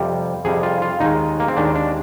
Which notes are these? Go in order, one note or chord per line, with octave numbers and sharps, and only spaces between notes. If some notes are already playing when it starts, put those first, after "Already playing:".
Already playing: F2 C3 G3
F2 C3 G3 G#4
F4
F4
D#2 D#3 G#3 D#4
A#3
C4
D#2 D#3 G#3 D4
D4